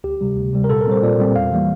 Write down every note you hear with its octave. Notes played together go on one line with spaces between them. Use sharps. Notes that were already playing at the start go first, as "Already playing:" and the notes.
D2 G4
C3 G3
D2
C3 G3
A#4
A#2 A4
A#4
G3 C4 C5
A#2 D5
G3 C4
E2 F5
E3 G3 A#3